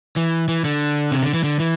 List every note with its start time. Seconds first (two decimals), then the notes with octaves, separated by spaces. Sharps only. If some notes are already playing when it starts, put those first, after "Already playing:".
0.16 E3
0.48 E3
0.65 D3
1.12 C3
1.23 D3
1.34 E3
1.44 D3
1.59 E3